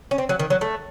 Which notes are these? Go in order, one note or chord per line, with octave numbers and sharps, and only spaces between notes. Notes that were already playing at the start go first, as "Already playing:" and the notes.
C#4
C4
F#3
D#3
F#3
A3